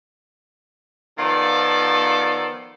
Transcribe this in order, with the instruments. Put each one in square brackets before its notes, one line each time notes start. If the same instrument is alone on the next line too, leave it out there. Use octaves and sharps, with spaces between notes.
[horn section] D#3 F3 B3 F4 A4 D5